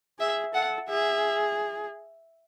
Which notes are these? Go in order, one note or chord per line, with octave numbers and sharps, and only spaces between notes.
G#4 E5
A4 F#5
G#4 E5